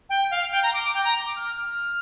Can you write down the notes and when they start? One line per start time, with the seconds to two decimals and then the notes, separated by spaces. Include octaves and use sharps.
0.09 G5
0.30 F5
0.52 G5
0.63 A#5
0.73 D6
0.83 D6
0.94 G5
1.04 A#5
1.25 D6
1.36 F6
1.57 F6